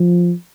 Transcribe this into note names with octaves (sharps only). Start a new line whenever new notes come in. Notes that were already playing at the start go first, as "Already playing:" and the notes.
Already playing: F3